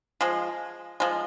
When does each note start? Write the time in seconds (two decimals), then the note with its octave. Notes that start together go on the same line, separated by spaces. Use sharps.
0.21 F3 G#3
1.00 F3 G#3